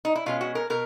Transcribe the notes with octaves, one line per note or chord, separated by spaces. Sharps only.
D#4
E4
B2 G#3 C#4 F4
F#4
A#4
B2 A#4